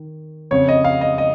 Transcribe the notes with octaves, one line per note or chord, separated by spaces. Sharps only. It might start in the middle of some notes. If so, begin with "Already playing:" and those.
Already playing: D#3
F2 C#3 C#5
D#5
F5
D#5
D#5